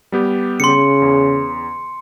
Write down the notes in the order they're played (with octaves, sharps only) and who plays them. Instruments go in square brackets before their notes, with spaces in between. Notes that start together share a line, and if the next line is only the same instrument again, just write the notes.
[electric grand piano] G3 B3 G4
[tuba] C#3 [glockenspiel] C6 C#7
[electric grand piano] E2